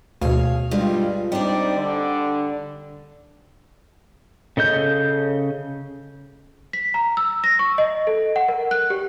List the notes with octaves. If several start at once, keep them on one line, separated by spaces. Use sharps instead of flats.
D2 B2 G#4 C#5 F5
G2 G3 G#3 D4 F4
G3 C4 D4 D#4 D5
D3
C#3 A4 D#5 G6
B6
A#5
E6
A#6
C#6
D#5
A4
F#5
A#4
F#6
G4